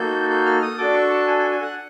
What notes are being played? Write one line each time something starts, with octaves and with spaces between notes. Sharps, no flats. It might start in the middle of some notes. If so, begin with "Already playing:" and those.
Already playing: A#3 D#4 F#4 A4 G6
G6
F6
D#6
D4 F#4 A4 D6
C#6
A5
G#5
G#5
G#5
F#5